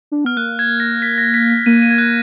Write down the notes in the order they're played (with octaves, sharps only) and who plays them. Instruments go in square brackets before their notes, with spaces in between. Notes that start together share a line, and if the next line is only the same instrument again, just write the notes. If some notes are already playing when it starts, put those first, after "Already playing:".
[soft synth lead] D4
[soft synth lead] B3 [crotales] F6
[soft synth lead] A#3 [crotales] F#6
[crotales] G#6
A#6
B6
A#6
B6
B6
[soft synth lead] A#3 [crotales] D#7
[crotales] D#7
G#6
F#6